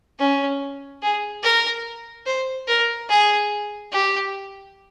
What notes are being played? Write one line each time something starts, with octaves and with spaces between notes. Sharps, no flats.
C#4
G#4
A#4
C5
A#4
G#4
G4